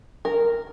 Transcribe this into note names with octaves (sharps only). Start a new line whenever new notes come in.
A#4